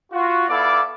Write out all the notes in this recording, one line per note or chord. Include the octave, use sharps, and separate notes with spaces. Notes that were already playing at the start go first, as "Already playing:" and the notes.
F4 F#4
B3 E4 A4 D5 F5 D6